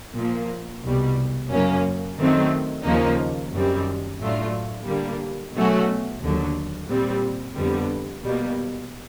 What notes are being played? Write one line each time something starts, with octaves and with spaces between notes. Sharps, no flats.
A#2 F3 A#3
C2 B2 G3
F#2 C#3 F#3 A#3 C#4
F#2 D#3 F#3 A3 C4
D#2 C#3 F3 A#3 D#4
F#2 D#3 G3 C4
A2 F#3 A3 D4 F4
D3 G3 A#3
B2 F#3 A3 C#4 F#4
D#2 D3 F#3
A#2 G3 C4
F2 D3 G3 B3
B2 G3 A#3